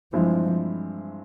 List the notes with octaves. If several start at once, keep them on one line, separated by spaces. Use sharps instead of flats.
G2 E3 F3 G#3 C4 E4